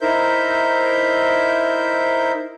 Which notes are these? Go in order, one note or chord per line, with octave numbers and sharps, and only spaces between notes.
D#4 E4 A#4 C5 E5 G6